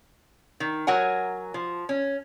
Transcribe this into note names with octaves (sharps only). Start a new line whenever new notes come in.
D#3
F#3 A#4 F#5 G#5
F3
C#4